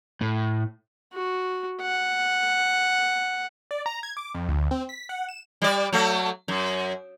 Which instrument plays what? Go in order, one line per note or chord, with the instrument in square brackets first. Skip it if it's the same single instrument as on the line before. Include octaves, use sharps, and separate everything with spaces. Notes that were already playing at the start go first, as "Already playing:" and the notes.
[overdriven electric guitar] A2
[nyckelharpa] F#4
F#5
[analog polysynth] D5
A#5
G#6
D6
F2
D2
C4
B6
F#5
E7
[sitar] G3 D5
F#3 A3
F#2